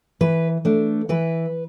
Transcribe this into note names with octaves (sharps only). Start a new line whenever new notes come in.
E3 B4
A3 D4
E3 B4